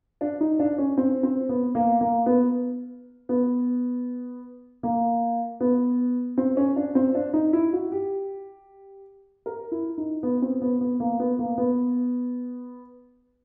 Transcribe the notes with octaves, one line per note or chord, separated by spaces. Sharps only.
D4
D#4
D4
C#4
C4
C4
B3
A#3
A#3
B3
B3
A#3
B3
C4
C#4
D4
C4
D4
D#4
E4
F#4
G4
A#4
E4
D#4
B3
C4
B3
B3
A#3
B3
A#3
B3